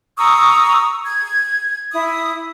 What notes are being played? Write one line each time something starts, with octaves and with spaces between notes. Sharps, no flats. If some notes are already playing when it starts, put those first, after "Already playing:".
A#5 C#6 D#6 E6
G#6
E4 D#6